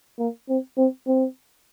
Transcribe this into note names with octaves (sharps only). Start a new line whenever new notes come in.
A#3
C4
C4
C4